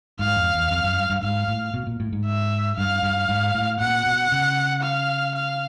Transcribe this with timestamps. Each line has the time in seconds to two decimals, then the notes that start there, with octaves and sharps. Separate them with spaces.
0.19 G#2 F5
0.36 F2
0.54 E2
0.71 F2
0.84 F#2
0.97 G2
1.10 G2
1.22 G#2 F5
1.48 A2
1.74 B2
1.87 A#2
2.00 A2
2.12 G#2
2.26 E5
2.77 G2 F5
3.03 G2
3.29 G#2
3.55 A2
3.80 A#2 F#5
4.06 B2
4.32 C#3
4.83 F5
5.35 F5